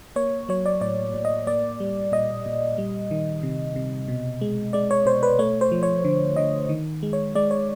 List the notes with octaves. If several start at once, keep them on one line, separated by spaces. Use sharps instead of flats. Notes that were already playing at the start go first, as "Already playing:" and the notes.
A#3 C#5
F#3 C#5
D5
A2 D5
A2
D#5
A#3 D5
G3
A#2 D#5
A#2
G3
D#3
C3
C3
B2
G#3
G#3 D5
C#5
B2 C5
B4
A3 C#5
C5
F3
C#5
D3
D3 D#5
D#3
G#3
C#5
G#3 D5
C#5